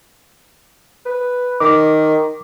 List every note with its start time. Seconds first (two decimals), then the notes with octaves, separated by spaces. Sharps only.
1.06 B4
1.60 D#3 D6